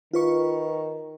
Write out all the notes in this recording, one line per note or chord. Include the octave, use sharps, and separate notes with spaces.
D#3 F4 B4 C#6